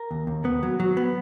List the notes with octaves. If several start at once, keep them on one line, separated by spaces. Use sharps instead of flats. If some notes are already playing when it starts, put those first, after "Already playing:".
Already playing: A#4
D#2
D#2
B3
F#3
F#3
B3